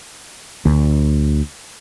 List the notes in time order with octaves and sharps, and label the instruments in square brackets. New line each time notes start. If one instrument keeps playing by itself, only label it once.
[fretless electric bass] D2